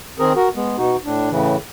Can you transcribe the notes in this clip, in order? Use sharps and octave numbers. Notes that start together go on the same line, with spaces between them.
D#3 C4 G#4 A#4
F#4 A#4
G#3 B3
B2 D#4 F#4
A2 D4
A2 C#3 E3